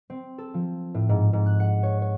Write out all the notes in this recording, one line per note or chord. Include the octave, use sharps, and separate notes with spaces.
C4
A4
F3
A2
G#2
G#2
F#6
F#5
C#5
C#5